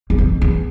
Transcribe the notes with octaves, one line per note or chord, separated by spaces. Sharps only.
E2
F2
E2